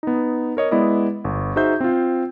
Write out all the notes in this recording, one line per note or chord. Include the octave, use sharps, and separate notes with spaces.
B3 D#4
A#4 C#5 D#5
G#3 B3 E4 D5 D#5
G1
D#4 F#4 G#4 C5 E5 G6
C4 F4